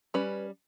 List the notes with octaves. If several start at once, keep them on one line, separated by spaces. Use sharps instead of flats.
G3 C#4 B4